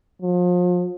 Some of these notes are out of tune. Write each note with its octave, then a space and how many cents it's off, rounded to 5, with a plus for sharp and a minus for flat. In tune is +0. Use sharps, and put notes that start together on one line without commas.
F3 +35